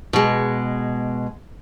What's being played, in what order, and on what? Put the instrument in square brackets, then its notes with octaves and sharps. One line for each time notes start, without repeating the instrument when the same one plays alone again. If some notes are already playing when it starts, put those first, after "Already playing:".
[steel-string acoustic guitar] B2 G#3